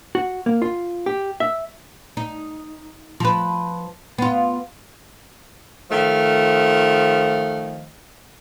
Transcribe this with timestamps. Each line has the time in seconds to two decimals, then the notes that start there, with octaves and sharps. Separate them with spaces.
0.15 F#4
0.46 A#3
0.62 F4
1.06 G4
1.40 E5
2.17 D#4
3.20 F3 B4
4.18 B3 F4
5.90 D#3 F3 A3